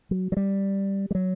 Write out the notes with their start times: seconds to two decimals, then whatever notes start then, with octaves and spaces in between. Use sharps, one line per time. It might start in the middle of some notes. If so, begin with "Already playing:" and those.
0.11 F#3
0.32 F#3
0.37 G3
1.11 G3
1.15 F#3